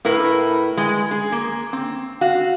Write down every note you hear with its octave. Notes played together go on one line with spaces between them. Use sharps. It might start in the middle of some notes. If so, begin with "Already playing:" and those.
A2 E4 A#4 B4
G#3
G#4
A#3
C4
F#4 F5